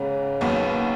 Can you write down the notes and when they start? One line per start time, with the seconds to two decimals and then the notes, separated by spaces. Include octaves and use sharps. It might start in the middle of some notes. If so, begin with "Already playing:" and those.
Already playing: G#2 C#3 B3
0.41 D#2 D#3 F#3 B3